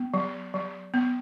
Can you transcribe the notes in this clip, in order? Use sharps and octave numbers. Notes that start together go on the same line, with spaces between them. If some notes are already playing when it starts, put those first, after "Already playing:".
Already playing: B3
F#3
F#3
B3